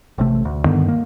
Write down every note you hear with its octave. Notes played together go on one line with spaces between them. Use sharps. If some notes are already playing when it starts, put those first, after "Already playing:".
A1 C3 A3
D2
G2 D3 D#3 B3
A#3